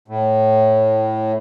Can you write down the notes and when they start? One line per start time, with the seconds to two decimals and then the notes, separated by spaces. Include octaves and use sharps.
0.08 A2